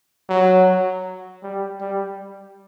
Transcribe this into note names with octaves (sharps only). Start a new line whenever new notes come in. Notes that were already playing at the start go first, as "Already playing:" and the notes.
F#3
G3
G3